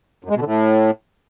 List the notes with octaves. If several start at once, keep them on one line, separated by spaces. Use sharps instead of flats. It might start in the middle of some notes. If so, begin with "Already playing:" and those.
F#2
G#3
B2
D3
A2